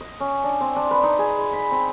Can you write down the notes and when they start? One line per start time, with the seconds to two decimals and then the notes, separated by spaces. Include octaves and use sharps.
0.01 D#5
0.20 C#4
0.44 D4
0.61 C4
0.76 D4
0.91 B4
1.03 D#4
1.19 G#4
1.38 G#3
1.53 B5
1.71 C4